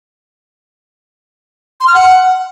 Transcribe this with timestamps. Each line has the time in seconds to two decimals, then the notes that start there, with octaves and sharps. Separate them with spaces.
1.81 C6
1.87 F6
1.94 F#5